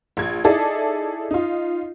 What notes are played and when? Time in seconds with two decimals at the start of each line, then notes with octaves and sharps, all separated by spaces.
0.17 A#1 G#6
0.44 D#4 E4 G#4 A4 D5
1.31 D#4 F4